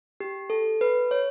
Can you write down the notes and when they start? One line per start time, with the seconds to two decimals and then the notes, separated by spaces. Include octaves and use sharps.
0.20 G4
0.50 A4
0.81 B4
1.11 C#5